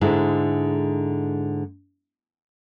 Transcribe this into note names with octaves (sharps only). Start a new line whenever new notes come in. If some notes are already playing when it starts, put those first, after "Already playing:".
G#2 D3 G#3 E4